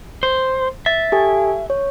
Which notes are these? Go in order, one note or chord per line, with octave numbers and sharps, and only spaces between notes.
C5
E5 A6
G4 A4 G#5
C#5